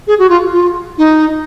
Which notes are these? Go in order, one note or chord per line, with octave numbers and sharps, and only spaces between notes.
G#4
F#4
F4
F4
D#4